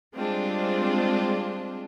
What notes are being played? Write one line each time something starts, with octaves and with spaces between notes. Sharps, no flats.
G3 G#3 C4 D4 F4